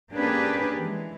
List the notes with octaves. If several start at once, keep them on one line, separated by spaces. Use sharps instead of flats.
A#3 C#4 D4 G4 G#4 B4
E3 G#3